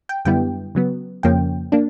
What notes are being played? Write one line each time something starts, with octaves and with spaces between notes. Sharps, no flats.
G5
F#2 D3 G3 B3 E4 G5
C#3 F#3 B3
F2 C#3 F3 A#3 C#4 G5
A#3 D4